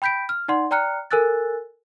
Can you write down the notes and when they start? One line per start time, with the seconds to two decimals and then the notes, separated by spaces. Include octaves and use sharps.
0.02 G5 B5 G6 B6 D7
0.29 F6
0.48 D#4 D5 F#5 C6
0.71 D5 G5 A#5 F6 F#6 C#7
1.11 A4 A#4 G#5 E6 F#6 A6